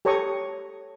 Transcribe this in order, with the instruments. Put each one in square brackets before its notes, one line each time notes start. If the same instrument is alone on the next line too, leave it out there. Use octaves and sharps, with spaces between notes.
[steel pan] G4 A4 C#5 A#5 C#6 D#6